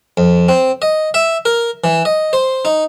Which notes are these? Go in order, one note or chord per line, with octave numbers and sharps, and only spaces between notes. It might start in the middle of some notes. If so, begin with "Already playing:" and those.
F2
C4
D#5
E5
A#4
E3
D#5
C5
D#4